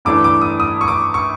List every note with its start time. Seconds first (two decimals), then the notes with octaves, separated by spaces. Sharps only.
0.05 G2 E3 A3 D4 D6
0.24 D6
0.42 D#6
0.60 D#6
0.81 C#6
0.88 D6
1.14 C#6